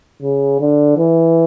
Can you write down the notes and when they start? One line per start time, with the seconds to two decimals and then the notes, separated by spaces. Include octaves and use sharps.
0.22 C#3
0.60 D3
0.97 E3